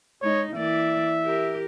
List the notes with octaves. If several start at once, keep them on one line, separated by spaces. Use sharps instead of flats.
G#3 D#4 C#5
E3 A#3 D5 E5
G4 A#4